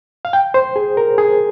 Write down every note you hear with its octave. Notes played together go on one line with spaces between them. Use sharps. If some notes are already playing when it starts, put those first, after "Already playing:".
F5
G5
C5
G#4
A#4
G#4